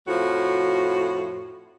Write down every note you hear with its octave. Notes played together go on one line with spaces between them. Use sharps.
F2 A2 F3 F#4